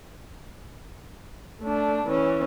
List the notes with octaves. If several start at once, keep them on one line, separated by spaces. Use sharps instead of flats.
A3 D4
E3 C#4